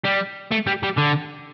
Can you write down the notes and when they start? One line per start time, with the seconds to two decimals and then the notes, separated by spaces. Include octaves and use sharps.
0.05 G3
0.51 A3
0.67 G3
0.83 G3
0.98 D3